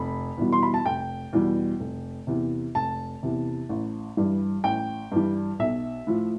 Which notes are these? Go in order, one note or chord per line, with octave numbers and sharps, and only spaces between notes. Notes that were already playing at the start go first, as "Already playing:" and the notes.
Already playing: F1 B5
E2 B2 G3
C6
B5
A5
F1 G5
E2 B2 G3
F1
E2 C3
F1 A5
E2 C3
A1
G2 E3 G3
A1 G5
G2 E3 G3
B1 E5
A2 F3